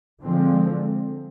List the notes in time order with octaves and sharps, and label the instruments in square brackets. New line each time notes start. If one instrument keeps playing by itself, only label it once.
[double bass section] D3 F3 G#3 C4